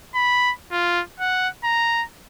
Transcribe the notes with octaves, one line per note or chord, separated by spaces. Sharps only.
B5
F4
F#5
A#5